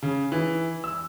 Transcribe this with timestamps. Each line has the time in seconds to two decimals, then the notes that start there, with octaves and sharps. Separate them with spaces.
0.03 C#3
0.32 E3
0.84 E6